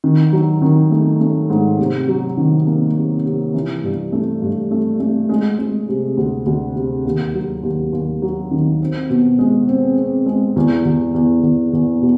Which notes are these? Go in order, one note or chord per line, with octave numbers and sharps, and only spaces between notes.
D#3
F#3
D#3
A3
A3
G#2
C3
F#3
D#3
A#3
C3
C3
E3
G2
A3
G2
A3
A3
G#3
G#3
C3
D2
D2
C3
D#2
F#3
D#2
D#2
F#3
D#3
C4
B2
G#3
C4
C4
G#3
E2
E2
E2
E2
E2
B2